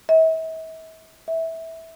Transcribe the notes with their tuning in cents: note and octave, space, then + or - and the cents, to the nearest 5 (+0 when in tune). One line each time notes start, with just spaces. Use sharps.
E5 -40
E5 -15